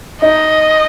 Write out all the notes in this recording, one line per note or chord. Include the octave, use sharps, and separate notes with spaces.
D#4 D#5